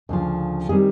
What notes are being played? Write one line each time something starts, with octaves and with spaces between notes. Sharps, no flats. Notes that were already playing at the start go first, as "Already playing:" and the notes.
D2 C#3 F3
D#3 G3 C4 G#4